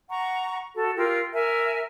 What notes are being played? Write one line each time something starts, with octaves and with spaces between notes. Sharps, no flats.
F#5 A#5 C#6
F#4 A4
F4 G4 A#4 E6
A#4 E5 G#5